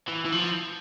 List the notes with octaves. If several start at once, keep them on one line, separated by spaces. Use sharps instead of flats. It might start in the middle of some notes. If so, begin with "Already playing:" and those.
E3
E3
F3